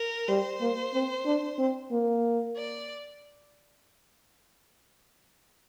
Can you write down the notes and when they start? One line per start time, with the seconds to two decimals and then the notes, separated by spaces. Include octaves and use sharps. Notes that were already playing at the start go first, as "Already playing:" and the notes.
Already playing: A#4
0.28 G3 C5
0.61 A#3
0.94 C4
1.26 D4
1.59 C4
1.92 A#3
2.57 D5